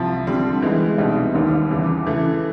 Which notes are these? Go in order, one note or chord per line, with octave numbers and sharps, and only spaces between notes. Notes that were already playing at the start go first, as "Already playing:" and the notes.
Already playing: C2 C3 F3
D3 G3 C4
E3 G#3 B3
C2 B2 G3 C4 D#4
D#2 D#3 G3 B3 D#4
E2 C#3 E3
C#3 E3 A3